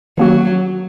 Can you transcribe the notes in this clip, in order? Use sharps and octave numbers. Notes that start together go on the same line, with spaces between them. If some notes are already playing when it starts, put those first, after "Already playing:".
D#3 F#3 A#3 C#4 F#4